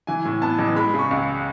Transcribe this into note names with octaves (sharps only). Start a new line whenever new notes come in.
E3 G#5
A2
B3 A5
A1
G#3 B5
C#3
C#6
C#2